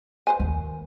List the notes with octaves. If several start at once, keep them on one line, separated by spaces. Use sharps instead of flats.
B4 C5 G#5
D#2